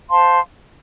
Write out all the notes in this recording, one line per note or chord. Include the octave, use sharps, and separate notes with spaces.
C5 F5 A5 C6